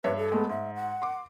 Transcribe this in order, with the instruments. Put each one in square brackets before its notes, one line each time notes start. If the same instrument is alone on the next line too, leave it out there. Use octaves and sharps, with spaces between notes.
[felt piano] G2 C#5 E5 [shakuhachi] B4
[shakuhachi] A4
[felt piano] G#3 A3 B3
[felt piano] G#2 [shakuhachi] E5
[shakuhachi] F#5
[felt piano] C6 D6